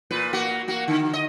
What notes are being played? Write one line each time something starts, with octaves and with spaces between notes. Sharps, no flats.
A#2 B4
A#3 F#4
A#3 F#4
D3
D#5